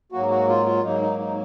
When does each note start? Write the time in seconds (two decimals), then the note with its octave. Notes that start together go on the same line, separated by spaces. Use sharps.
0.12 G#2 F#3 A#3 F#4
0.30 F#4
0.48 F4
0.66 F4
0.83 G#2 F#3 A#3 D#4
1.02 D#4
1.19 D#4